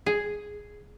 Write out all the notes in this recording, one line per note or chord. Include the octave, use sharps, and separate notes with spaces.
G#4